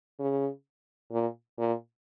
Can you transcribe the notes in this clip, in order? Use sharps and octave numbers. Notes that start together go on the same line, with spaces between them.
C#3
A#2
A#2